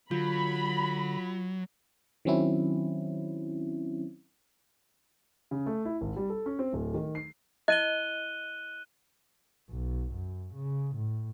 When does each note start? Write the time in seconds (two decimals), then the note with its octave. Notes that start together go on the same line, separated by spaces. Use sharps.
0.11 D3 F#3 F4 B5
2.25 D#3 F#3 C4 C#4 E4
5.51 C#3
5.66 A3
5.85 E4
6.01 G#1
6.16 G3
6.30 A4
6.46 C#4
6.59 C4
6.73 D1
6.94 D#3
7.15 C7
7.68 E4 D#5 F#6 D#7 G7
9.70 B1
10.14 F#2
10.55 C#3
10.96 A2